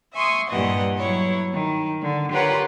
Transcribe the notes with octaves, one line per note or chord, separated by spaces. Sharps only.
E5 G#5 C6 C#6 D#6
G2 A#2 E3 G4 D#5 F#5
F#3 E4 C#5
D#3
D3
F4 G4 A#4 B4 C#5 F#5